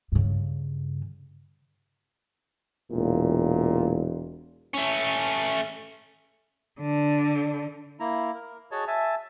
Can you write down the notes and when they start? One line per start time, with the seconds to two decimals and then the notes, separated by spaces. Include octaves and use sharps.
0.12 G2 C#3
2.91 E1 A#2
4.74 A3 C#4
6.80 D3
8.00 A#3 E4 A#5
8.35 A#4
8.71 F#4 G#4 C#5 D#5 A5
8.87 E5 G#5 A5